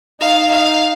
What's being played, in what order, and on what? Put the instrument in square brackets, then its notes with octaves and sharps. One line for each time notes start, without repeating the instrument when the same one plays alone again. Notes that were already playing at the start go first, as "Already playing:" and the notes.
[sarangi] D#4 [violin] F5
[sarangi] D#4 [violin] F5